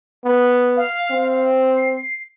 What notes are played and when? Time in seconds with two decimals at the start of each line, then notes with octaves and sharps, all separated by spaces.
0.25 B3
0.77 F5
1.11 C4
1.77 C7